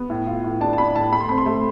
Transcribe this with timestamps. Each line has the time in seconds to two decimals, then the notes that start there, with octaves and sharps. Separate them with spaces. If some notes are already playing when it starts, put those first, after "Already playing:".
Already playing: B3
0.10 A2
0.27 F4
0.44 A2
0.61 D4 A5
0.73 A5
0.78 D4 B5
0.95 A2 A5
1.13 A3 B5
1.21 C6
1.29 C4 B5
1.38 C6
1.46 A3